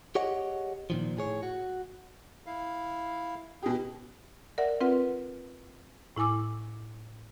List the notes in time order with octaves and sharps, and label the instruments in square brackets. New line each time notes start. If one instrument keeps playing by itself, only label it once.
[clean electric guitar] G4 G#4 C#5 D#5 F#5
A#2 D#3 F3
A2 G#4 C#5
F#4
[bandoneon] E4 F5
[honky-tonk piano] B2 G4 [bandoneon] G#4
[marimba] A#4 D5 E5 F#5
C4 F4 B4 F#5
A2 E4 G#5 D6 E6